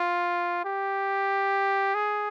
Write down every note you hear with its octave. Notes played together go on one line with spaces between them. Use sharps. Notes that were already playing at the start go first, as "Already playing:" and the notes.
Already playing: F4
G4
G#4